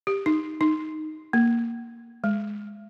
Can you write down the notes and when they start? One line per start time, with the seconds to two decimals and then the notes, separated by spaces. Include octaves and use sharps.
0.07 G4
0.26 D#4
0.61 D#4
1.33 A#3
2.24 G#3